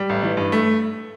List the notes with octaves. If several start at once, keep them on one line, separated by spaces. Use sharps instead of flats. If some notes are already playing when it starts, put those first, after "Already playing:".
Already playing: G3
A1
E3
G2
A3